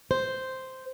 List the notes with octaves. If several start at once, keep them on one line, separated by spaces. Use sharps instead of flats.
C5